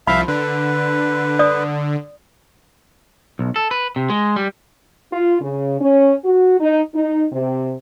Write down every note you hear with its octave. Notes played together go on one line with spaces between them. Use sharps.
C2 F3 E5 F5 B5
D3 B4
D5 D#6
B1
A4
B4
C3
G#3
G3
F4
C#3
C#4
F#4
D#4
D#4
C3